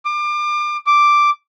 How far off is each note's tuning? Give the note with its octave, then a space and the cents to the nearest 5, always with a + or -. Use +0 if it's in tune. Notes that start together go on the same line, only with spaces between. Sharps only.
D6 +30
D6 +0